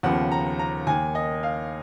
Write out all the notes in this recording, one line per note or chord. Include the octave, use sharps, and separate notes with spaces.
D#2 C#3 F3 B3 F#5
A#5
A#5
D#2 D#3 A#3 G#5
D#5
F5